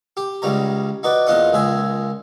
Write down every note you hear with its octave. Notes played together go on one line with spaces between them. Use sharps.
G4
C#2 C#3 G3 C#5 A#5
D#4 F#4 B4 D5
E2 A#2 F4 D#5 F#5 D#6
C#2 A#2 G#4 E5 G#5